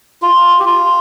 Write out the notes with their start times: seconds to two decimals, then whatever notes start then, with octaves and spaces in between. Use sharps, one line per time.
0.22 F4
0.60 G4
0.65 F4